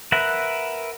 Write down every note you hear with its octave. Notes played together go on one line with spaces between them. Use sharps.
A#4 B4 E5 F#5